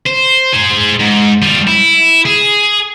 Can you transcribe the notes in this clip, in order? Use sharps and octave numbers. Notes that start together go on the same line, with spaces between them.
C5
G#4 C5
G#2
G3 F4
E4
G#4